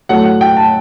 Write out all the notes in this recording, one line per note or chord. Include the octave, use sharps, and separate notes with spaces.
A2 F#3 A3 F#5
F#5
G5
A5